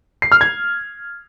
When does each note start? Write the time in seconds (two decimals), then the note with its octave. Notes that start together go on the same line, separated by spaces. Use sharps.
0.22 C7
0.32 F6
0.41 G#6